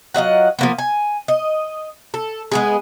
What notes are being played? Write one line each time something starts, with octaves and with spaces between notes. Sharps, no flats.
F#3 F4 D#5 F#5
F3 A#3 B3
G#5
D#5
A4
G#3 B3 G#4